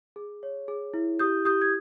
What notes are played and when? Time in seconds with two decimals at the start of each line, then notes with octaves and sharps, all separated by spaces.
0.16 G#4
0.43 C#5
0.68 G#4
0.94 E4
1.19 G4 D#6 G6
1.45 G4 D#6 G6
1.61 G#6